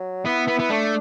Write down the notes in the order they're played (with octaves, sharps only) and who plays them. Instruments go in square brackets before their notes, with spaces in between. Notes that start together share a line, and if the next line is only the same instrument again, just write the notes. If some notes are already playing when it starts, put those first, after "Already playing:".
Already playing: [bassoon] F#3
[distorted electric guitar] B3 [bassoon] E4
[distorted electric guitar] B3
B3
[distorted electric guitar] A3 [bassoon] D4